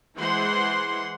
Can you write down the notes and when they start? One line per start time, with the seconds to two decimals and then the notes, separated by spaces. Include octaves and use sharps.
0.16 E3 G#3 C5 F#5 C6